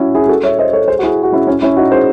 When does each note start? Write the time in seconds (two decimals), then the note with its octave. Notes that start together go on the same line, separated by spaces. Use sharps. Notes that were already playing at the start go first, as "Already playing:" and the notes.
Already playing: C#4 E4 F#4
0.15 E4 G#4
0.29 F#4 A4
0.43 C#5 E5
0.59 C5 D#5
0.73 A4 C#5
0.88 G#4 C5
0.99 F#4
1.03 E4 G#4
1.23 F#4
1.32 C#4 E4
1.47 C#4 E4
1.62 C#4 E4
1.77 D#4 F#4
1.92 G#4 C5